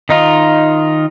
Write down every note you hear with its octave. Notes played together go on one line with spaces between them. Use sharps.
D#3 D#4 F4